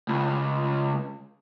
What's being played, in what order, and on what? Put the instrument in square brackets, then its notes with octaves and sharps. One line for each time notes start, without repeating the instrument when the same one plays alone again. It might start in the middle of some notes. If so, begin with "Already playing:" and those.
[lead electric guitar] C#2